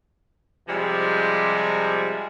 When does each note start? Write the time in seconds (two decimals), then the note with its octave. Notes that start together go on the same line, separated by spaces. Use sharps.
0.68 C3 F3 G3 G#3